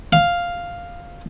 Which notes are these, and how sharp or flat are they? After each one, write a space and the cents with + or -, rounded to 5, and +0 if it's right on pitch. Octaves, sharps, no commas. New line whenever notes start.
F5 +0